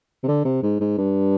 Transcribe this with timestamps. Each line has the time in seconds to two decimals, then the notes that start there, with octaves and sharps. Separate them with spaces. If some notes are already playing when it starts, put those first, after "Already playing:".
0.23 C3
0.28 D3
0.45 C3
0.63 G#2
0.80 G#2
0.98 G2